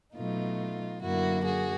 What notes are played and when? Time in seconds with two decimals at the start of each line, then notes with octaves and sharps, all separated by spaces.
0.15 B2 F#3 A3 D#4 F4
1.01 F#2 D3 F#3 A#3 E4 F#4
1.44 F#4 G#4